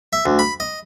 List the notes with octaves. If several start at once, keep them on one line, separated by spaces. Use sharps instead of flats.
E5
D2
B5
D#5